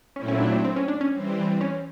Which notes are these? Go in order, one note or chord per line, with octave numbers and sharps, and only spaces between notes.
A#2 F#3 A3 C4 C#4 E4
C#4
D4
D4
C4
C#4
D4
C#4
E3 G3 C4
C#4